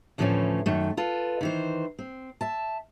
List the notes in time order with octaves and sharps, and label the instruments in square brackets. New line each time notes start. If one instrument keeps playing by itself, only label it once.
[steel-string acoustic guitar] D2 A2 E3 F3 A3 C#4
F#2 D#3 A3
F4 A4 B4
D#3 E3 C5
C4
E5 A5